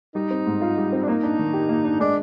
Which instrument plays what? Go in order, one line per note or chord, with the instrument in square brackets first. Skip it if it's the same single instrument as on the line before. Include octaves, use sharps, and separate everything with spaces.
[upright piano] G3 [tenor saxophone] D#4
[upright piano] C4
G#2
F4
G3
C4
[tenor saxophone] D4
[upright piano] A#3 [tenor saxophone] D#4
[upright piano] D4
D#3
G4
A#3
D4
[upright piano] G#3 [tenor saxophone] D4